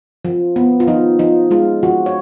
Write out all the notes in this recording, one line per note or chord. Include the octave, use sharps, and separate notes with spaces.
F3
B3
F4
F3 D#4
F3 D#4
G#3 F4
F3 F#4
C#5